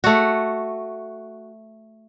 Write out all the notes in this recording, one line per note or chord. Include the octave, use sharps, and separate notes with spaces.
A3 F#4